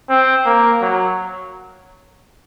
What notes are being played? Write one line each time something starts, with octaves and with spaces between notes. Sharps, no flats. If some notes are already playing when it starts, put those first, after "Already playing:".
C4
A#3
F#3